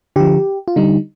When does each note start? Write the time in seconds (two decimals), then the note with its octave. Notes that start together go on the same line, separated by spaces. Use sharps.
0.16 D3 F3 G4
0.68 F4
0.76 D3 G3 D#4